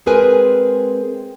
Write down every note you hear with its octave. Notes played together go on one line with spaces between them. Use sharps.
G#3 C4 G#4 A#4 B4 G#5